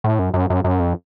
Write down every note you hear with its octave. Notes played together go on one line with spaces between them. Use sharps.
A2
F#2
F#2
F#2
F#2
F2